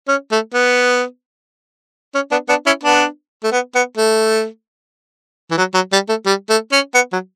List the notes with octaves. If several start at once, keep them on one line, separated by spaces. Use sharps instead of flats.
C#4
A3
B3
C#4
B3 D4
B3 D4
C#4 E4
B3 D4
A3
B3
B3
A3
E3
F#3
F#3
G3
A3
G3
A3
C#4
B3
F#3